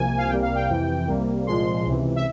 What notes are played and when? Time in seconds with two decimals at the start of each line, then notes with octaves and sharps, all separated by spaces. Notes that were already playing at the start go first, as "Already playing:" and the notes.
Already playing: C2 C3 F3 A#3 G#5
0.18 F5
0.29 C2 C3 G3 A#3 G5
0.42 F5
0.55 G5
0.69 F2 C3 E3
1.07 C2 C3 G3 A#3
1.46 C2 A#2 F3 G#3 C6
1.86 C#2 C3 E3
2.16 E5